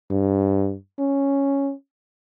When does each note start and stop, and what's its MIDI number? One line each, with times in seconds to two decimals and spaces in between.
0.11 0.75 43
0.99 1.72 61